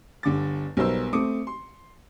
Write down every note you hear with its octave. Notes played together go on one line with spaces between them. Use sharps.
G1 D3 D6 A6
B1 G3 B3 A#4 C5 E6
A3 C4 D6 D#6 C#7
C6